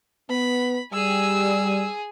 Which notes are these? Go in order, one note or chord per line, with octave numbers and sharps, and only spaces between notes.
B3 B5
G3 G#4 G#5 E6